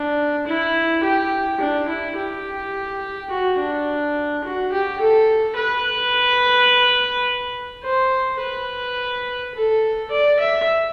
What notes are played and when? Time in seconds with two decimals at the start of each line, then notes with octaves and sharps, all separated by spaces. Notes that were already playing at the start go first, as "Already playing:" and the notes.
Already playing: D4
0.47 E4
1.03 G4
1.60 D4
1.88 E4
2.16 G4
3.30 F#4
3.59 D4
4.44 F#4
4.72 G4
5.00 A4
5.57 B4
7.84 C5
8.41 B4
9.54 A4
10.11 D5
10.39 E5